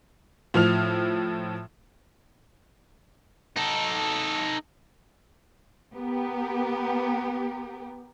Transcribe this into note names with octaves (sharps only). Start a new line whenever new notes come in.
A2 F3 F6 F7
D#4 A4
B3 G4 A#4